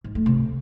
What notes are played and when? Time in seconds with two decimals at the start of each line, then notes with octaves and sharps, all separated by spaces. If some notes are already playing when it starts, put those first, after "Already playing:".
0.04 G#2
0.15 A3
0.26 C3